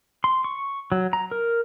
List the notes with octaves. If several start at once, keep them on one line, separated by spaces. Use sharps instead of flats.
C6
C#6
F#3
A#5
A#4